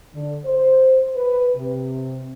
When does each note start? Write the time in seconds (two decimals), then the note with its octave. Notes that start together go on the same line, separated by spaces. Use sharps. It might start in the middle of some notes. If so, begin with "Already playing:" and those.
0.15 D3
0.46 C5
1.16 B4
1.56 C3